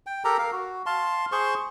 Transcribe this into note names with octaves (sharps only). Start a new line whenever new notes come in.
G5
G4 A4 A#4 A#5
A#4 F5
F#4
F5 A5 C6
G#4 C5 C6 C#6